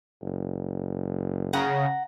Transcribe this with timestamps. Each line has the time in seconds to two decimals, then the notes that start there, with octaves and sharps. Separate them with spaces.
0.22 F#1
1.53 C#3 F#5 A#5